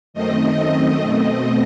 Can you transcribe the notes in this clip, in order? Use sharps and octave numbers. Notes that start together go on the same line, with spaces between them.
F#2 D#3 A3 C4 D#5
D#5
B2 A3 C4 D#5